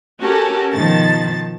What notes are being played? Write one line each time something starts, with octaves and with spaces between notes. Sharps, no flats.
C#4 F#4 G4 A4 A#4
B2 D#3 F3 A5 A6